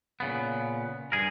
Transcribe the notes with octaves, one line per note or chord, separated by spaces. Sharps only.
A#2 C#3 B3
G2 G#4 A#4